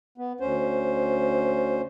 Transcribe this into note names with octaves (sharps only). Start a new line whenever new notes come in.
B3
D2 C#4 C5